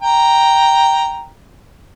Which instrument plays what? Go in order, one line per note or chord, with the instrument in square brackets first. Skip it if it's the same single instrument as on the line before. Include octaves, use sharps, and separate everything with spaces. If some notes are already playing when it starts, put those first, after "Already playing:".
[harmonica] G5 A#5